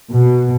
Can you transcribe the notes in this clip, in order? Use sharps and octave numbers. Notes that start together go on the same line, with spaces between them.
B2